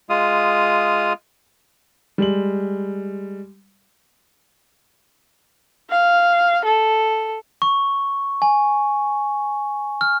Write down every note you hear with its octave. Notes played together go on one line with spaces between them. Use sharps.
G#3 F4 F5 D#6
G3 G#3 F#7
F5
A4
C#6
G#5
F6